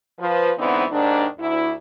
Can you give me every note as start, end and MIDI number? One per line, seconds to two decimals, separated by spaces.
0.19 0.52 53
0.19 0.52 71
0.58 0.84 44
0.58 0.84 50
0.58 0.84 52
0.58 0.84 59
0.58 0.84 60
0.58 0.84 63
0.91 1.26 39
0.91 1.26 44
0.91 1.26 51
0.91 1.26 62
1.39 1.73 38
1.39 1.73 64